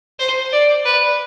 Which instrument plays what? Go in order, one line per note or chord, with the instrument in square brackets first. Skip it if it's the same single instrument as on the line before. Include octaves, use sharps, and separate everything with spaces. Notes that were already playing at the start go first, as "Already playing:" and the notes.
[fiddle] C5
D5
B4